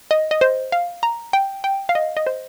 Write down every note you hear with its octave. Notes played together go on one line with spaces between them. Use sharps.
D#5
D#5
C5
F5
A#5
G5
G5
F5
D#5
D#5
C5